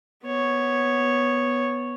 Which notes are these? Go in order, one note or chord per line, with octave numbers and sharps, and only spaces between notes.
B3 C#5